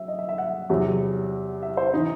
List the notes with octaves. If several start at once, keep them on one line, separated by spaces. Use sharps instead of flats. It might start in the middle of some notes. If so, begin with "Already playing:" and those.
Already playing: F#3 E5
D#5
E5
E5
F#5
E2 C3 F#3
E5
C5
E3 D#4